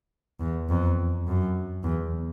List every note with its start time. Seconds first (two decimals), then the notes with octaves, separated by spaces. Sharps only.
0.40 E2
0.69 F2
1.27 F#2
1.84 E2